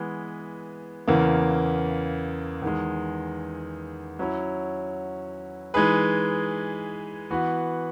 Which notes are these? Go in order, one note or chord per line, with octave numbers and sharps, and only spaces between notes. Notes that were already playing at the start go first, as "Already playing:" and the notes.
Already playing: E3 G#3 B3
E2 C#3 E3 A#3
E2 D#3 G#3
F#3 C#4 E4
E3 G#3 D#4 G#4 B4
E3 B3 F#4